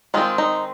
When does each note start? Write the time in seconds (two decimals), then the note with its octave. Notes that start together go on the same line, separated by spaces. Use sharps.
0.14 D#3 G#3 C4 F4
0.38 D#4